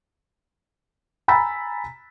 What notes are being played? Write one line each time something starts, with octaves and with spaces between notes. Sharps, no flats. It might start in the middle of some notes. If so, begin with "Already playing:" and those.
G#5 A#5 B5 E6 A6 B6